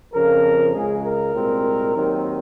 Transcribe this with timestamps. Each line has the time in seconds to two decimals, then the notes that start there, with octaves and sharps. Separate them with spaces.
0.14 F2 C#3 F3 A#4
0.74 C#2 C#3 G#3 G#4
1.04 A#4
1.34 C2 A#2 G#3 C4
1.95 D#2 D#3 F#3 C4